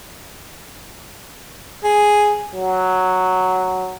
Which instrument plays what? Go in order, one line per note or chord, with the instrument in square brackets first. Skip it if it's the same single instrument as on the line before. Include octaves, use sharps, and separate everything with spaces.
[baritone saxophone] G#4
[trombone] F#3